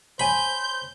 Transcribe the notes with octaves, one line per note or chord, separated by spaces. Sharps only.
C5 C#5 G#5 A5 B5 G6